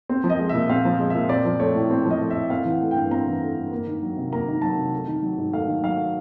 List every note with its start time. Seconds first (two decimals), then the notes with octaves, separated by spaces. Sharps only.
0.09 C4
0.24 F3
0.30 D#5
0.39 G#3
0.49 A#2 E5
0.69 C4 F5
0.85 F3
1.00 G#3
1.10 A#2 E5
1.29 C4 D5
1.45 F3
1.59 A3 C#5
1.75 A2
1.91 C4
2.05 F3
2.10 D#5
2.20 A3
2.30 E5
2.36 A2
2.50 C4 F5
2.65 E3
2.70 F#5
2.81 A3
2.91 G2 G5
3.11 C4 A#5
3.26 E3
3.42 A3
3.56 G2
3.72 A#3
3.87 D#3
4.02 F#3
4.17 C3
4.32 A#3 A#5
4.47 D#3
4.62 F#3 A5
4.77 C3
4.93 A3
5.08 D#3
5.22 F#3
5.37 G#2
5.53 A3 F5
5.68 D#3
5.83 F#3 F5